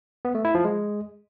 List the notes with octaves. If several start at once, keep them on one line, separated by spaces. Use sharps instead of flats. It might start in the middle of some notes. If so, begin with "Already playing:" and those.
B3
A3
E4
F3
G#3